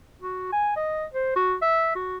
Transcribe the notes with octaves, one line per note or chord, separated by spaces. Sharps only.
F#4
G#5
D#5
C5
F#4
E5
F#4